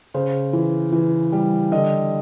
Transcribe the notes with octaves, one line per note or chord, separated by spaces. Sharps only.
C#3 C5
E3
E3
G3
D3 D#5